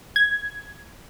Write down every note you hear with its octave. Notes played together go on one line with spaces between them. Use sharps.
G#6